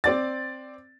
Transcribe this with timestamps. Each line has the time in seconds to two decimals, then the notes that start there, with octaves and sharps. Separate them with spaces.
0.04 C4 D5 A6